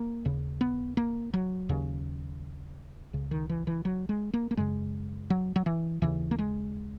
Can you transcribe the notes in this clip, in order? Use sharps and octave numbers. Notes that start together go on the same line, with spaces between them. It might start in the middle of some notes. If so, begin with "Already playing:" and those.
Already playing: A#3
D#2 C#3
B3
A#3
F#3
D#2 C#3
C#2 C#3
D#3
E3
E3
F#3
G#3
A#3
A#3
F#2 C#3 G#3
F#3
F#3
E3
D#2 C#3 E3
A#3
G#3